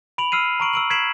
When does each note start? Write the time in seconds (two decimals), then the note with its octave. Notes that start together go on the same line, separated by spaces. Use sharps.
0.18 B5 D7 F7 F#7
0.32 E6 F6 C7 D#7
0.60 A#5 C#6 D7 F#7
0.73 E6 D7 F#7
0.90 G#6 B6 C7 D7 E7 F#7